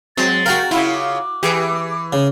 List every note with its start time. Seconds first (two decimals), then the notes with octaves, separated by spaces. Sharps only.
0.17 F#3 G#3 C4 A6
0.46 F#4 A#4 F5 G5 C#6
0.71 C#3 E4 F4
0.93 D6
1.43 E3 G4 G#4 B4
2.13 C#3